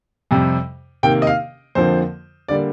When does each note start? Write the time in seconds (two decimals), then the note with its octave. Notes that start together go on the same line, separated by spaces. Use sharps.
0.31 F2 C3 G3
1.03 C3 D#3 A#3 G5
1.22 D#5
1.27 F5
1.75 F2 D3 F3 A#3 C5
2.48 D3 G3 A#3 D5